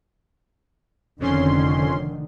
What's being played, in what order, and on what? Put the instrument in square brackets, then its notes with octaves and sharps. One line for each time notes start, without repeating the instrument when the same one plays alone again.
[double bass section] F1 D3 D#3 [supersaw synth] F2 C#4 C6